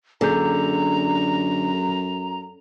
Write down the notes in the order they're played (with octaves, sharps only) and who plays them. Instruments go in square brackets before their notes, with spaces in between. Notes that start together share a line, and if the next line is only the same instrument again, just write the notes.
[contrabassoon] F#2 [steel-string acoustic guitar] D3 [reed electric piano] A#3 G#4 G6 [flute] A#5